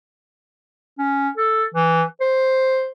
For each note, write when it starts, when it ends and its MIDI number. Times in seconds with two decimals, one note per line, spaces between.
0.99 1.29 61
1.37 1.63 69
1.74 2.02 52
2.21 2.90 72